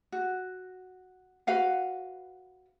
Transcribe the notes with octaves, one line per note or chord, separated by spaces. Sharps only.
F#4
F#4 B4 F5 F#5